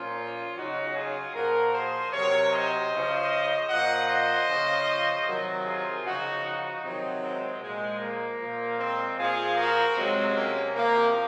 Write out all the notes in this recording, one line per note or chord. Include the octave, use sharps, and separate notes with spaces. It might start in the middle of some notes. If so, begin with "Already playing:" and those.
Already playing: A#2 F3 C#4 F4
C#3 F#3 D#4 F#4
F4 G#4
A#2 F3 F#4 A#4
G#4 C5
C3 F#3 A#4 C#5
C5 D#5
C#3 F3
A#2 F3 D#5 F#5
C5 D#5
C#3 F3
C3 D#3 F#3
F4 G#4
C#3 F3 D#4 F#4
D#4 F#4
C3 D#3 F#3 C4 D#4
G#3 C4
A#2 F3 G#3
A#3
A#2 F3
G#3 C4
A#2 F3 F4 G#4
F#4 A#4
C3 F#3 G#3 C4
A#3 C#4
C3 F3 A#3